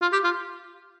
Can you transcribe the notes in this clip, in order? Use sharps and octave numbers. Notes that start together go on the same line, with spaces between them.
F4
G4
F4